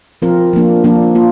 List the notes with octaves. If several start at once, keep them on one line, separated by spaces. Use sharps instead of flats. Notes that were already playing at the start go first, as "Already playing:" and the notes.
F3 C4 F4 A#4
F3 A#3 D4
F3 A#3 D4
A#3 F4